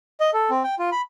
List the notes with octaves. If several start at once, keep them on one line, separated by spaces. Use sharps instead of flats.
D#5
A4
C4
G5
F4
B5